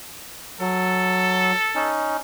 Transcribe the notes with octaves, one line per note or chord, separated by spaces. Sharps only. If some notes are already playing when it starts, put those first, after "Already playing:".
F#3 A4
C#4 D#4